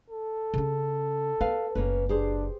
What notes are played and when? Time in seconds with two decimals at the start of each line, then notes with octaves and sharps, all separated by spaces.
0.10 A4
0.54 C#3 C#4
1.41 B3 B4 F5
1.75 F#1 A#3 C#4 B4
2.09 D4 G4 G#4 C5